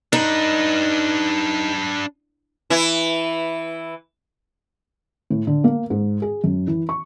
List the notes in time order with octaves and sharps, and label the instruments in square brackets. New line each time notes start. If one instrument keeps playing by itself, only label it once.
[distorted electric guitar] D4 B4 [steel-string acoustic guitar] D#4
[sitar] E3 E4
[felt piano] A2
D3
A#3
G#2
G#4
F#2
E3
C#6